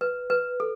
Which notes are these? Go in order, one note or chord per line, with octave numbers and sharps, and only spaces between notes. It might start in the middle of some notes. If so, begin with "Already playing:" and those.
B4
B4
A4